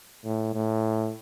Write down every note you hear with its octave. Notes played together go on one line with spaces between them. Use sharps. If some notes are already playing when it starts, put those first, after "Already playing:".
A2
A2